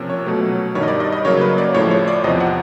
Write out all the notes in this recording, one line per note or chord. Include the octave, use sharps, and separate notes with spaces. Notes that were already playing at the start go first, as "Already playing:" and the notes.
Already playing: C3 F3 A#3 C#4
C#5
B2 F#3 A3
G2 D#3 G3 C#5
D#5
D5
D#5
D#5
C#3 F#3 A#3 C#5
B4
D5
A2 F3 G#3 C#5
C#5
D5
E2 C3 F3 D#5
F#5